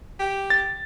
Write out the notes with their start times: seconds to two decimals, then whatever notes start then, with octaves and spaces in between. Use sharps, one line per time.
0.20 G4
0.50 A6